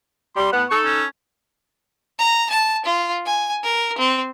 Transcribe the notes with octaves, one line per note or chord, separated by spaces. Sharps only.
G3 C6
A2 B3 F#5
D#4 A4 C#6
C#4
A#5
A5
F4
G#5
A#4
C4